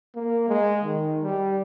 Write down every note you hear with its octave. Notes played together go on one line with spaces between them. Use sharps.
A#3
G#3
D#3
G3